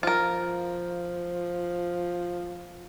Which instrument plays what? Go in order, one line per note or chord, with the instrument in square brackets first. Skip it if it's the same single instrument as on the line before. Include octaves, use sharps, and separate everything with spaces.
[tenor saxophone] F3 [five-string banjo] F4 A#4